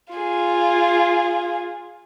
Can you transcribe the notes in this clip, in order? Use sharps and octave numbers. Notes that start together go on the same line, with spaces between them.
F4 G#4